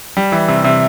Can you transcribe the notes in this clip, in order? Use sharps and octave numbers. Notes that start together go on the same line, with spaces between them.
G3
E3
C3
C3